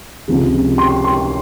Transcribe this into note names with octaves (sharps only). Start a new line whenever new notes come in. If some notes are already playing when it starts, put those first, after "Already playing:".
C#2 C3 F3 G#3
C6
C6